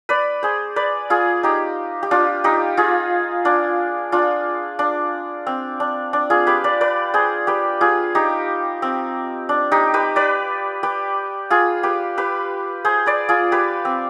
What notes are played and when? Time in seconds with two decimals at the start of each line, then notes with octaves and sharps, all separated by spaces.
0.09 B4 D5
0.43 G#4 C5
0.76 B4 D5
1.10 F4 G#4
1.43 D#4 G4
2.03 G4
2.11 D4 F4
2.44 D#4 G4
2.77 F4 G#4
3.45 D4 F4
4.12 D4 F4
4.79 D4
5.47 C4
5.80 D4
6.13 D4
6.30 F4 G#4
6.47 G4 B4
6.64 B4 D5
6.81 B4 D5
7.14 G#4 C5
7.47 G4 B4
7.81 F4 G#4
8.15 D#4 G4
8.82 C4
9.49 D4
9.72 D#4 G4
9.94 G4 B4
10.16 B4 D5
10.83 G4 B4
11.50 F4 G#4
11.83 G4 B4
12.18 G4 B4
12.85 G#4 C5
13.06 B4 D5
13.29 F4 G#4
13.52 G4 B4
13.85 C4